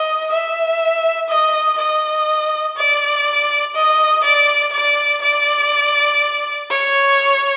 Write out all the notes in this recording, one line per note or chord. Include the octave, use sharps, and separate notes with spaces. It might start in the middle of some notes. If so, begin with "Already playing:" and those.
Already playing: D#5
E5
D#5
D#5
D5
D#5
D5
D5
D5
C#5